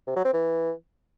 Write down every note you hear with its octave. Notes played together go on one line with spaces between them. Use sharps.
C3
F#3
C4
E3